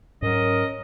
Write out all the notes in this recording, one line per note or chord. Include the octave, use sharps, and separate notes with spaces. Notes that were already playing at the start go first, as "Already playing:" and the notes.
G#2 F#3 C#4 A#4 D#5